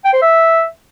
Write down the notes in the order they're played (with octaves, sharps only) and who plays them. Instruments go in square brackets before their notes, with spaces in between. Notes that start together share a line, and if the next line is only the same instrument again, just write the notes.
[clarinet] G5
C5
E5